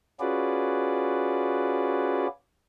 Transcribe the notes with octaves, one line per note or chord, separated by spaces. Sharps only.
C#4 F4 F#4 G#4 B4 D5